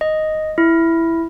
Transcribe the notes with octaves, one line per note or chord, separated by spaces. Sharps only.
D#5
E4